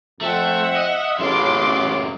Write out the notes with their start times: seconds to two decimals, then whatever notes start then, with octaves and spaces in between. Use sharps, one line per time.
0.21 F2 A3 C4 E5 F#5
0.76 D#5
1.19 A1 F#2 A2 C#3 F4 C6 D6